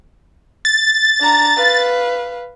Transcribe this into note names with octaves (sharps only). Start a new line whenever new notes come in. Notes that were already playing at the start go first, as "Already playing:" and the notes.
A6
D4 A#5
B4 F5